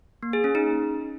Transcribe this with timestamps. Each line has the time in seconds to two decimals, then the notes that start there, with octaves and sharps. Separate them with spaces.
0.23 A#3
0.33 G#4
0.44 C#4
0.55 D#4